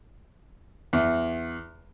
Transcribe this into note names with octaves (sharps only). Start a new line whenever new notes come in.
E2